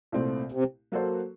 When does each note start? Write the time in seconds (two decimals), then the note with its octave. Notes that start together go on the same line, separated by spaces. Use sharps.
0.12 C2 A#2 A3 C4
0.52 C3
0.92 F#3 A#3 F#4 A4 C5